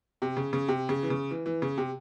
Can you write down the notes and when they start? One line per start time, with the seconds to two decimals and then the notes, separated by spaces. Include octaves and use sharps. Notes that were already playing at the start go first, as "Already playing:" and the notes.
0.22 C3
0.37 C#3
0.53 C#3
0.68 C3
0.89 C#3
1.03 E3
1.10 C#3
1.31 E3
1.46 E3
1.62 C#3
1.78 C3